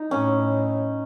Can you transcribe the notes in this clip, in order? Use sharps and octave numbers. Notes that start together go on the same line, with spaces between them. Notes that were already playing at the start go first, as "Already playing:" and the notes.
Already playing: D#4
A2 C#4